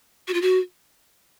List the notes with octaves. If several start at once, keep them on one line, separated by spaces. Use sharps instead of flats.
F#4
F4
F#4